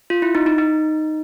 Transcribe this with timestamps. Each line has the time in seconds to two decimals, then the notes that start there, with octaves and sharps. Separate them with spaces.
0.10 F4
0.22 E4
0.35 D#4
0.46 D#4
0.58 D#4